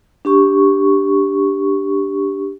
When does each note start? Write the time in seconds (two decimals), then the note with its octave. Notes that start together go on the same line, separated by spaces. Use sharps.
0.25 D4 G4 C#6